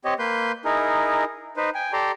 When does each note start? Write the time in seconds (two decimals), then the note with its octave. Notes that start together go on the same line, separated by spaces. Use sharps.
0.05 C4 G4 C#5 D#5
0.19 A#3 B4 C6 G6
0.65 D#4 E4 G#4 A#4
1.57 D#4 B4 C5
1.74 G5 G#5
1.93 G4 A4 D5 A#5 C6